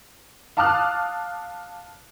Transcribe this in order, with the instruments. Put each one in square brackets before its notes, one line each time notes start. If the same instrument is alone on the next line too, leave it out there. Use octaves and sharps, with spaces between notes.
[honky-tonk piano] F5 A5 D6 D#6 F6 F#6